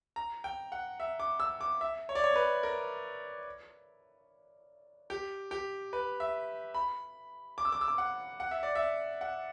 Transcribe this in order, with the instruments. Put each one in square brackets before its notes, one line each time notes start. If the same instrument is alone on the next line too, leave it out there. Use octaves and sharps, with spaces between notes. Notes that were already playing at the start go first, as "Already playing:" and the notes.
[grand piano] A#5
G5
F#5
E5
D6
E6
D6
E5
C#5
D5
C#5
B4
A#4
G4
G4
B4
E5
B5
D6
E6
D6
E6
D6
F#5
F#5
E5
D5
E5
F#5